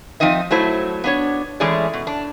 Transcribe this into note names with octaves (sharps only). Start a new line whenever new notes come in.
F3 C4 D#4 D#5 E5
F#3 A3 E4 C5
B3 D4 C#5
E3 G#3 A3 C#4 G#4 D5
B2
D4